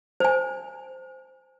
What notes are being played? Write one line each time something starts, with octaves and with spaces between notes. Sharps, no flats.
C5 G#5